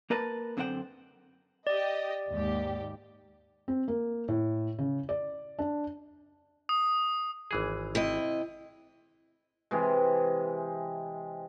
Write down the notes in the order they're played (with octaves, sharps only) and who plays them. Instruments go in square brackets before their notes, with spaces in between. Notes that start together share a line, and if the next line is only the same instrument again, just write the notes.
[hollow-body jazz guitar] A#3 A#4 B4 A5
F#2 D3 C4 C5 F#5 G5
[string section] G4 D#5 [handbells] D5
[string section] D#2 G#2 G4
[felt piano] C4
A#3
A2
C#3
D5
D4
[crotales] D#6
[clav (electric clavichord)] G#1 E3 G#4
[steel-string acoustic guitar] C3 E4 D#5
[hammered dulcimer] C3 E3 G#3